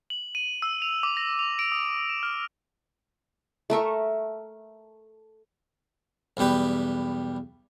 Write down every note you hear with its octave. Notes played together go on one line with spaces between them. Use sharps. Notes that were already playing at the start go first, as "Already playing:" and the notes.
F#7
D#7
E6
F7
D6
A#6
F7
D7
D#6
E7
F6
A3 A#4 E5 C#6
B1 E2 G3 G4 B4